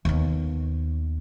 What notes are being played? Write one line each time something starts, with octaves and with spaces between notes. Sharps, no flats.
D#2 B3